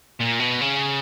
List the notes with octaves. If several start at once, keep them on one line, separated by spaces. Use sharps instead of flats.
A#2
B2
C#3